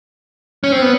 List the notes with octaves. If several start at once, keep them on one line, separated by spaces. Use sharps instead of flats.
C#4
C4
B3